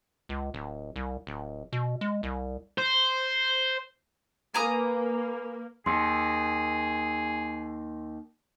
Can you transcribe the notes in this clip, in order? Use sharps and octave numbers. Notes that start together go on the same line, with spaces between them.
C#2
D1
C2
D1
B2
G#3
C2
C5
A#3 B4 G#5 A#5 D#6
D#2 G#4 C6